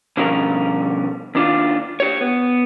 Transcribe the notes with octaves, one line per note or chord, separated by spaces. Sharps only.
B2 D3 F3 G3 C#4 A#4
D#2 D4 F4
G4 C#5
B3